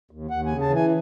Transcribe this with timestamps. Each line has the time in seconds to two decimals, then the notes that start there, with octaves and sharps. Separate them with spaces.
0.11 D#2
0.30 D#2 F#5
0.46 C#3 G#5
0.61 A5
0.70 E3
0.76 G#5